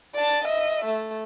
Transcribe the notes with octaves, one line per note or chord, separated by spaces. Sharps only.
D5 A5
D#5 E5
A3